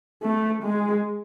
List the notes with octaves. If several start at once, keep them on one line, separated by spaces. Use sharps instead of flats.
A3
G#3